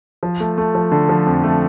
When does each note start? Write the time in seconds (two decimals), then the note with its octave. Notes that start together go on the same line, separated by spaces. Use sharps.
0.23 F3
0.40 A3
0.58 A3
0.75 F3
0.92 D3
1.09 F3
1.26 F2
1.44 A3